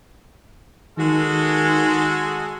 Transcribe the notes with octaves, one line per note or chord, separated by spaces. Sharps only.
D#3 G#3 F#4 A4